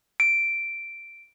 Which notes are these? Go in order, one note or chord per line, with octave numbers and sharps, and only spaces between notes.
D7